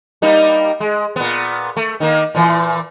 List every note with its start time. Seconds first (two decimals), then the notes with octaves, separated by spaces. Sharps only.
0.22 G3 A#3 D#4
0.80 G#3
1.16 A#2 B3
1.77 A3
2.00 D#3 A#3
2.35 A#2 E3